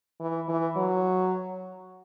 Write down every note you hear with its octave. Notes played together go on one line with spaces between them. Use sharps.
E3
E3
F#3